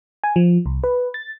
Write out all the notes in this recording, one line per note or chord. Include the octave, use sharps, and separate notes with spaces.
G#5
F3
C2
B4
A6